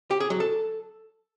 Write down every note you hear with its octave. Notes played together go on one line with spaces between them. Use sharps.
G4
G#4
F#3
A4